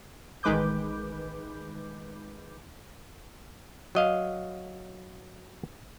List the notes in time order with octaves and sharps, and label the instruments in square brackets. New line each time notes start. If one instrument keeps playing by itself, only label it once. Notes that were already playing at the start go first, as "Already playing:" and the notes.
[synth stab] A1 D#3 G#3 B4 D6 G6
[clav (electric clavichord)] F#3 D#5 F5